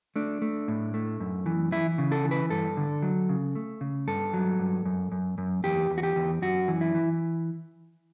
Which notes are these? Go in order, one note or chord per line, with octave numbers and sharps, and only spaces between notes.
A3 D4
A3
A2
A3
F#2
E3
E3 E4
C#3
A4
E3
B4
G2 A4
D3
F#3
C#3
A3
C#3
G2 A4
F#3
G2
F#2
F#2
F#2
E2 G4
E2
F#4
G4
E2
F#2 F#4
E3
E4
E3